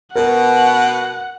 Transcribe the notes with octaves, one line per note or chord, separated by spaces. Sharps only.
B2 A#4 F#5